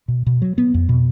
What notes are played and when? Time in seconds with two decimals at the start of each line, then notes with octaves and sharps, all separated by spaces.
0.08 B2
0.26 B2
0.42 F#3
0.58 B3
0.74 F2
0.89 B2